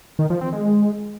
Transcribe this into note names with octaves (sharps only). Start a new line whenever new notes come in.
D#3
F3
C4
G#3